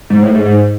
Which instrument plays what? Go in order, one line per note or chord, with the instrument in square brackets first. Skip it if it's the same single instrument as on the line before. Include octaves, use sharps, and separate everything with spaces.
[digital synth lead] G#2
A2
G#2
G#2